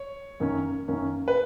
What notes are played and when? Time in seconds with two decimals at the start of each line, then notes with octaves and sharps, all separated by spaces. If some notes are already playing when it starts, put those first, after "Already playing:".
Already playing: C#5
0.40 F#2 D#3 A#3 C#4
0.88 F#2 D#3 A#3 C#4
1.28 B4